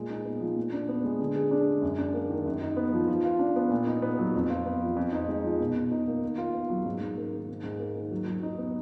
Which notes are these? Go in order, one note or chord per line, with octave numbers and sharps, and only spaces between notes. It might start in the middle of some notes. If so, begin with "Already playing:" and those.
Already playing: A#2 G#3
D#4
B3
F3
A#2
D4
B3
G#3
D3
G#4
D4
G#3
F#2
D4
A#3
D#3
F#2
D#4
B3
F3
F3
F4
D4
B3
A#2
D#4
B3
F#3
F2
F4
B3
F3
F2
D#4
G#3
F3
B2
B2
D#4
A#3
D#3
F4
B3
F#3
G#2
G#2
A#3
D#3
G#2
G#2
A#3
D#3
F#3
F#3
D#4
B3